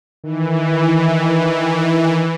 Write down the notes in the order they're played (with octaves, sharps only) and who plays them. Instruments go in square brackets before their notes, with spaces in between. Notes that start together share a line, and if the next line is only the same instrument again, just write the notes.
[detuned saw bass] D#3 [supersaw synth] E3